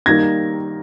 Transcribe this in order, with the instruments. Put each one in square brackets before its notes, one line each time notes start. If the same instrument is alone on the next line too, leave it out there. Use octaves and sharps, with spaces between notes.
[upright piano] D#3 G3 A#3 D#4 G#6 A#6